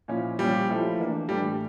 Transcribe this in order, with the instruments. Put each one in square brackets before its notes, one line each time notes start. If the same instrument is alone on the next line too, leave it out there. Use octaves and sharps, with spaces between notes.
[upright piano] A#2 F3 C#4 E4
[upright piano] A#2 F3 C#4 [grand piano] G3
[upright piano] F3 A3 E4
E3 A#3 D4
[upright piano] A2 E3 A3 D4 [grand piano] G3